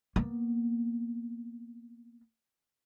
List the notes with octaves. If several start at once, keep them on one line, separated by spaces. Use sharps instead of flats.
A#3 B3